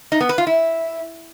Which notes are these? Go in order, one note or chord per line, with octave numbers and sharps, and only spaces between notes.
D#4
B3
B4
F4
E4